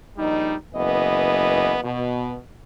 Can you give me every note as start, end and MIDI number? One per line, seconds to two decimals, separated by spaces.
0.17 0.54 34
0.17 0.54 55
0.17 0.54 63
0.74 1.77 30
0.74 1.77 52
0.74 1.77 59
0.74 1.77 75
1.83 2.36 47